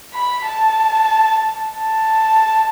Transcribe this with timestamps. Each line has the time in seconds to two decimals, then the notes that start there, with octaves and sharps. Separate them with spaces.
0.14 B5
0.46 A5
1.74 A5